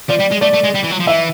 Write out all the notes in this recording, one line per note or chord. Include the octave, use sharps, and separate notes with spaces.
F3 D5
G3
G#3
A3 D5
A3
G#3
G3
E3
F#3
F3
E3 E5